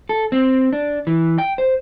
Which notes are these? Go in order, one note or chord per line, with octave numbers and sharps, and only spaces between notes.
A4
C4
D4
E3
G5
C5